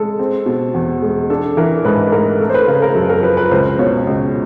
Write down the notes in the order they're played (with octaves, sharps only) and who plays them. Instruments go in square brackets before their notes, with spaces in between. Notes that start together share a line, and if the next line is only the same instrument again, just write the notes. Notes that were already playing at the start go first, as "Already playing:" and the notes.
Already playing: [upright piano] G#3 A4
C4
B2
E2
G#3
D4 A4
E3 A#4
G#2 B4
A3 A#4
A3 A4
C5
B4
C#3 A#4
A#4
F#2 A4
A#4
F3 B4
B4
C#2 C5
B2 C#5
C#2